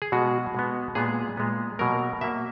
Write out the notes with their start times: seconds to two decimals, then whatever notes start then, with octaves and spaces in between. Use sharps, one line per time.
0.02 G#4
0.12 B2 G#3 B3 F#4
0.55 B2 G#3 B3
0.95 A#2 G#3 B3 G#4
1.37 A#2 G#3 B3
1.79 B2 F#3 A#3 A#4
2.21 B2 F#3 A#3 E5